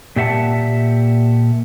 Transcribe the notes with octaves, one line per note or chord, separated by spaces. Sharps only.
A#2 G4 E5 F#5 A5